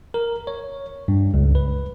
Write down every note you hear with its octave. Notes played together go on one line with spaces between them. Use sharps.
A#4
C#5
G2
C#2
B4